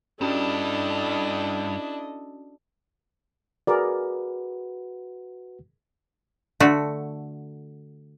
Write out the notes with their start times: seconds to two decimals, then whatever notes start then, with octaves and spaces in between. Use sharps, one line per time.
0.21 G2 C#4 D4 E4 F#4 A4 D#5 A5
3.67 F#4 G#4 A#4 B4 D5 F#5
6.60 D3 A3 F#4